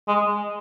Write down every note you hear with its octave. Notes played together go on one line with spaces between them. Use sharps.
G#3